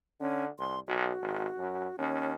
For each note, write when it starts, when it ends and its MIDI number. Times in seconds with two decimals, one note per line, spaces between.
0.20 0.48 50
0.20 0.44 61
0.59 0.79 36
0.59 0.80 84
0.88 1.11 35
0.88 1.96 66
1.22 1.47 32
1.58 1.87 42
1.98 2.35 39
1.98 2.32 61